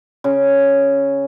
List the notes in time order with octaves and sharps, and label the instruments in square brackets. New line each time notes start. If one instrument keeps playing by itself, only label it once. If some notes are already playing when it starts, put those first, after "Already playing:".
[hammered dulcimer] C#3